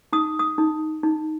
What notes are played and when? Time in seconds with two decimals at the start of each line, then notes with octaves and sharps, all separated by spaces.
0.13 D#4 D#6
0.39 D#6
0.58 D#4
1.03 D#4